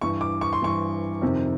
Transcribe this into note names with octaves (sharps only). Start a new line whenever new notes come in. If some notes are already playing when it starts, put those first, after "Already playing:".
G2 E3 C#6
D6
C#6
C6
G2 E3 C#6
F2 C3 D#3